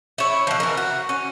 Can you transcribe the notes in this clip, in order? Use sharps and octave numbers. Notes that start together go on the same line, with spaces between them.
E4 C#5
B2 F3
E3 A#4
F#4
C#4